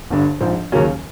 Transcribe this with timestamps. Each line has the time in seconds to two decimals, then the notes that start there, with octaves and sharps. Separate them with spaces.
0.10 G1 G2 D3
0.41 A#1 G#2 F3
0.72 D#2 C#3 F#3 A#3 C#4